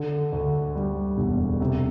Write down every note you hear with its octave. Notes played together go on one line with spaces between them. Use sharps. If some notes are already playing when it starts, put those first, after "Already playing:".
Already playing: D3
D2
G3
E1
C3